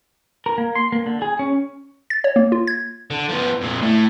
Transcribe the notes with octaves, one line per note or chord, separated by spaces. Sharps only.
A#4
A#3
C6
A#3
D3
G#4
C#4
A6
C#5
A#3
F4
G#6
D3
F3 B3
F2 A#2
A2